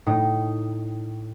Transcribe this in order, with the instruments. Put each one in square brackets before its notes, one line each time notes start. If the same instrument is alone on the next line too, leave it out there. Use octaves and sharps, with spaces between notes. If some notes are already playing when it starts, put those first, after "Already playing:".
[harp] A2 D#4